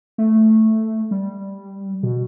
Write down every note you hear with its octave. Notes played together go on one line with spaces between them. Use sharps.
A3
G3
B2